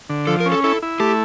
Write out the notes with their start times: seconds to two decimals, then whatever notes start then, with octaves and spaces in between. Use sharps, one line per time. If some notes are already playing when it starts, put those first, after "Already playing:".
0.10 D3
0.27 F3 A4
0.40 A#4
0.46 C#4
0.52 A4
0.64 E4 A4
0.82 E4
1.00 A3 G4